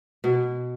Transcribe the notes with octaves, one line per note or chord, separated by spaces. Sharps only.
B2